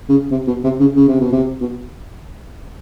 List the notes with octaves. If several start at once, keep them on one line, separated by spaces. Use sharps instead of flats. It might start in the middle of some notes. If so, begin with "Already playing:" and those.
C#3
C3
B2
C3
C#3
C#3
C3
B2
C3
B2